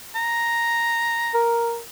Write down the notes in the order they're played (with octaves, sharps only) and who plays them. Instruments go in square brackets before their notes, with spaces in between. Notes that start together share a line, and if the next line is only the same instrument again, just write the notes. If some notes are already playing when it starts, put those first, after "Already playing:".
[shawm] A#5
[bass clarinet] A#4